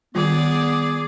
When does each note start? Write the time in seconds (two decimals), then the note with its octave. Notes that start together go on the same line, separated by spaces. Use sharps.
0.15 D#3 G3 B3 F4 G#4 D5